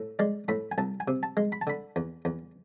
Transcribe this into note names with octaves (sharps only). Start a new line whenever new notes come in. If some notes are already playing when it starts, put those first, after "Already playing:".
Already playing: A2
G#3 D5
A2 B5
G#5
C2 A5
G#5
C3
A5
G#3
B5
A5
D3 B5
E2
E2